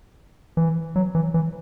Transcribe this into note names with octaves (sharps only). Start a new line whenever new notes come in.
E3
F#3
E3
E3